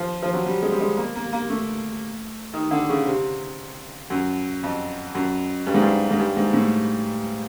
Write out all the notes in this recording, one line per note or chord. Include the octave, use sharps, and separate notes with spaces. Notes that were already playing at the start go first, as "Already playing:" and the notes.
Already playing: F3
F3
F#3
G3
G#3
G3
G#3
A#3
A#3
A#3
A3
D#3
D3
C#3
C3
F#2
F2
F#2
G2
G#2
G2
G#2
G2
G#2
A2